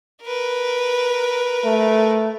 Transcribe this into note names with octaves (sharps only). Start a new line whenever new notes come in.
A#4 B4
A3